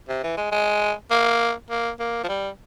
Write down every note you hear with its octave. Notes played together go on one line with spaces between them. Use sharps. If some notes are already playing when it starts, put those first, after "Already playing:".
C3
E3
G#3
G#3
A#3
A#3
A#3
F3
G3